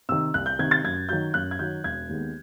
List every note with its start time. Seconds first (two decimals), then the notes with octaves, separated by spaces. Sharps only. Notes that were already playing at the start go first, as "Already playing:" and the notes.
0.09 C3 D#3 E6
0.34 C2 F#6
0.46 G6
0.59 C3 D#3 G#6
0.71 A6
0.84 F#2 G#6
1.09 D#3 F#3 G6
1.34 F#2 F#6
1.51 G#6
1.59 D#3 F#3 G6
1.84 E1 G#6
2.09 D#2 D#3 G#3 B3